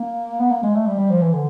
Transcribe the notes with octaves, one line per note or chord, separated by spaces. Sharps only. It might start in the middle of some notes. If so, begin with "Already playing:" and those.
Already playing: A#3
B3
A#3
G#3
A3
G3
G3
F3
E3
D3